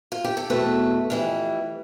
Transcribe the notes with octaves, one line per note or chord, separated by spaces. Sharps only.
F4
G4
A4
E2 B2 A3 C4 B4
F2 E3 G3